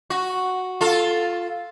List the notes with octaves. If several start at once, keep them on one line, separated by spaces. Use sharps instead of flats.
F#4
F4 A4